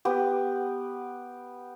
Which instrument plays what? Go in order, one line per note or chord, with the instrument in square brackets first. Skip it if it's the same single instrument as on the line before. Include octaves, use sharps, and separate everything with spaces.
[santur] B3 G4